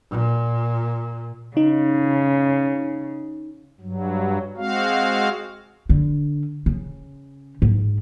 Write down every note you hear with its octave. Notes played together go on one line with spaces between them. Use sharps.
A#2
C#3 D#4
G2 F#3
G#3 C4 F#4 F5
D3
C#3
G#2